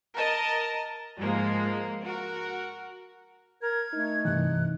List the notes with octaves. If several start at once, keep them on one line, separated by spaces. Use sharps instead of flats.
A#4 D#5 A5 A#5
G#2 F3 G#3 A#3
F#4 A#4
A#4 G#6
A3 D#4
G2 C3 E3 F#6